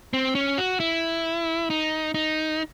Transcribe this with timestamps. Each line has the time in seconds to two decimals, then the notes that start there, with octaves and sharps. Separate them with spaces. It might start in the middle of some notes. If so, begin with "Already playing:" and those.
0.13 C4
0.35 C#4
0.58 F#4
0.80 E4
1.70 D#4
2.14 D#4